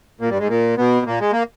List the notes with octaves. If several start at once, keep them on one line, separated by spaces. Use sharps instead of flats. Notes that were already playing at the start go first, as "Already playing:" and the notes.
A#2 A#3
G2 G3
G#2 G#3
A#2 A#3
B2 B3
A#2 A#3
G#3
A#3